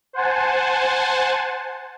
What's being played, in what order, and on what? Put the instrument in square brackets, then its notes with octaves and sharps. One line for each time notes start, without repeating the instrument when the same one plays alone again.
[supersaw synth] C5 F#5 G#5 A5